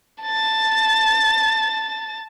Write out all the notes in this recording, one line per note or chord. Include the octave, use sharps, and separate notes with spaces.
A5 A6